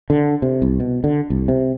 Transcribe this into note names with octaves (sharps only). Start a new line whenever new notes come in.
D3
C3
C2
B2
D3
C2
C3